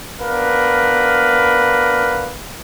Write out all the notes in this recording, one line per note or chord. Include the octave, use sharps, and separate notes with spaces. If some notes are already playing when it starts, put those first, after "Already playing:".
B3 D4 A#4 B4 F5